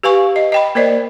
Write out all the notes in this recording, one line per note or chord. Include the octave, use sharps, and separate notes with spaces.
G4 B4 F5 G#5 C#6
D#5
D#5 G5 B5
A#3 A#4 C5 D5 D#5